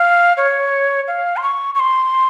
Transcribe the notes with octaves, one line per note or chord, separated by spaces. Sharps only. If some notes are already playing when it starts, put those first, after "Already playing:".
Already playing: F5
C#5
F5
C6
C#6
C#6
C6